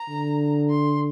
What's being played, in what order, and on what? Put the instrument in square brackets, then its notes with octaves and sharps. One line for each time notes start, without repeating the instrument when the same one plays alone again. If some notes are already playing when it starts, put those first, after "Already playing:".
Already playing: [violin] A#5
[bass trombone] D3
[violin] C6